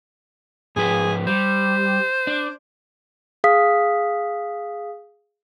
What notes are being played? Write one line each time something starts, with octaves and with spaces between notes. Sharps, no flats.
G#2 F3 G#4 B4
G3 C5
D4
G#4 F5 D#6 B6